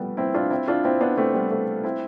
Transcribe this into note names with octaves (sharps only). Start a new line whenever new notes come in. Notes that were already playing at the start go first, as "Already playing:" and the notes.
Already playing: F3 G3 A3 B3
C4 E4
D4 F4
C4 E4
D4 F4
C4 E4
B3 D4
A3 C4
G3 B3
A3 C4
C4 E4